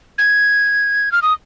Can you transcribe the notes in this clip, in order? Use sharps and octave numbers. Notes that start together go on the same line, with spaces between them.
G#6
F6
D#6